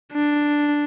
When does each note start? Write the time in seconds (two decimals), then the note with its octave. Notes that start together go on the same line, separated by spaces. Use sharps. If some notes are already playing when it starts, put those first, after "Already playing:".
0.13 D4